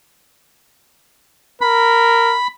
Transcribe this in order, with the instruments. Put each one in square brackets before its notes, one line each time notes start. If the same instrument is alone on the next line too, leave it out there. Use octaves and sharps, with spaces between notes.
[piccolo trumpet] A#4 [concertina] B5